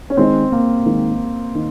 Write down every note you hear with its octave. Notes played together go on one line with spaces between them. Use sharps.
C#4
D#3 G#3 C4 D#4
A#3
D#3 G#3 D#4
D#3 D#4